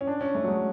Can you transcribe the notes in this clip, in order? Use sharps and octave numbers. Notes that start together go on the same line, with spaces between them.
C#4
D4
C#4
A3
F#3
G#3